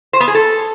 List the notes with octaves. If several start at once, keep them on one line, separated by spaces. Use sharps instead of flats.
C5
B3
G#4
A4